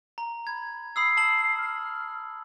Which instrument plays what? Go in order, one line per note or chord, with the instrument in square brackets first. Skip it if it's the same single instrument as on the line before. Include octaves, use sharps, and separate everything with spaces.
[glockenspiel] A#5
[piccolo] B5 [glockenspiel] G#6
[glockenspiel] B5 D#6 E6 [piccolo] C7
[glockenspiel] A5 E6 F#7
[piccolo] F6